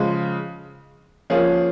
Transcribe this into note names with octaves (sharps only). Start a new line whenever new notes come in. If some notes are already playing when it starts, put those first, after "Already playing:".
Already playing: C#3 F3 G#3
F3 A#3 C#4 F4 G#4